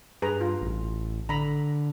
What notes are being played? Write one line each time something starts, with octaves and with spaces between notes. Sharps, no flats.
G2 G#4 B4 A#5
F4
A1
D3 A#5 B5